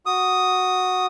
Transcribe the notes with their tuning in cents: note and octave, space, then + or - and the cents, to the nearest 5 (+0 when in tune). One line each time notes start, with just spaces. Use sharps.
F#4 -5 D#6 +0